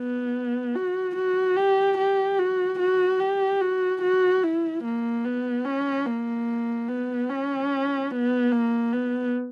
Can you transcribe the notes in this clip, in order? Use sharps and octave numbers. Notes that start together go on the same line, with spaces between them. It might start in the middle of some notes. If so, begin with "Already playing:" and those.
Already playing: B3
F#4
F#4
G4
G4
F#4
F#4
G4
F#4
F#4
E4
A#3
B3
C#4
A#3
B3
C#4
B3
A#3
B3